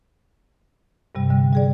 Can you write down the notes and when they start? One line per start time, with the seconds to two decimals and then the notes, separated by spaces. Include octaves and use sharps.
1.15 G2 C3 G3
1.30 D3 G3
1.53 G3 G#4 D5